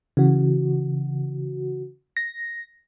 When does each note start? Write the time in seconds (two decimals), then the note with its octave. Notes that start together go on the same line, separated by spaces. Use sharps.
0.17 C#3 E3 F#4
2.17 A#6